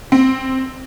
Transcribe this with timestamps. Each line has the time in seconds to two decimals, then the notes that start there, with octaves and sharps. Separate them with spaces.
0.12 C4